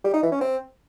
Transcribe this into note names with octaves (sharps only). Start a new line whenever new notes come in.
G3
D#4
E3
C#4
C4